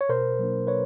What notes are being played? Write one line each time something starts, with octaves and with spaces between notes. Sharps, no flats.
C#5
B2 A#4 C5
F#3 A#3 D4
B2 B4 C#5